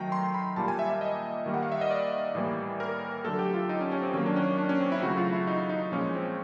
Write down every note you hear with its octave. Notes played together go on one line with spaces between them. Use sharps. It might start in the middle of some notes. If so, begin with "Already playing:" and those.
Already playing: D#3 F#3 A3 G5 A#5
C6
B5
A#2 G3 A#3 A5
G#5
E5
E5
D#5
D#3 G3 A#3
F#5
F5
E5
D#5
D5
A2 E3 G3 A#3
A#4
D3 F#3 A3 A4
G4
F4
D#4
C#4
C#4
C4
D#3 F#3 A#3 C#4
D4
C#4
D4
C#4
C4
E4
C#3 F#3 A3 F#4
F4
E4
D#4
D#4
A#2 F3 G#3 C#4
C4